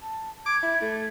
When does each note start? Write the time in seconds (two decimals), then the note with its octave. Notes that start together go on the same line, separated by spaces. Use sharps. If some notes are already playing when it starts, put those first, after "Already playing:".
0.02 A5
0.46 D6 G#6
0.63 E4
0.82 A3